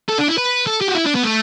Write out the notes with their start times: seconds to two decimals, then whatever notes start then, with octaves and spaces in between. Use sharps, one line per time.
0.09 A4
0.18 D4
0.28 E4
0.38 B4
0.67 A4
0.81 G4
0.88 F#4
0.95 E4
1.06 D4
1.16 B3
1.24 A3